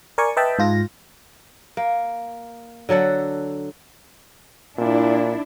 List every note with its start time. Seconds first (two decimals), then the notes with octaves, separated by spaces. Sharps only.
0.18 A#4 D5 G#5 C#6
0.37 B4 D#5 E5 G5 A5 B5
0.59 G#2 F4 A#6
1.77 A#3
2.89 D3 F#3 A4 F#5
4.78 A#2 D4 E4